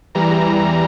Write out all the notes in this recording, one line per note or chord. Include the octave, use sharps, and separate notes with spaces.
E2 E3 G3 A#5